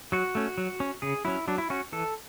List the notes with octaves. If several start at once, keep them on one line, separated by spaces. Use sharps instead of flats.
F#3 F#4
A3 C#4
F#3
C#4
C#3 G#4
F#3 C#4 E4
F#3 D4
E4
C#4 F#4
E3 A4